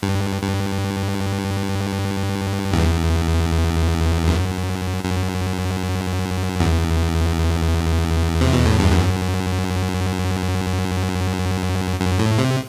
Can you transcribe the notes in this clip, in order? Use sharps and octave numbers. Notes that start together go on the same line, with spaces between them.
G2
G2
E2
F#2
F#2
E2
C3
B2
A2
G2
F#2
F#2
A2
C3